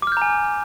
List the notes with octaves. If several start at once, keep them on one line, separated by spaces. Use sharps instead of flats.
G#5 A#5 D6 F6 G6